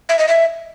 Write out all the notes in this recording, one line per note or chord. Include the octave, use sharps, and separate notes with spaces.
E5
D#5
E5